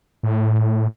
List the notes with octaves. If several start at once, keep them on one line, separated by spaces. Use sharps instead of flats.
A2